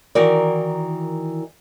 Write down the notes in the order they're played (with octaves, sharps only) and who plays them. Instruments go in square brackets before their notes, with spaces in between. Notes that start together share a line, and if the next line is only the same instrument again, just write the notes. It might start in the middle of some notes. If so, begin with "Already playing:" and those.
[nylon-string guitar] D#3 E3 F#4 A#4 D5